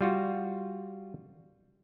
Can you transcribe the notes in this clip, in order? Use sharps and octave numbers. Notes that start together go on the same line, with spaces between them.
G3 F4 F#4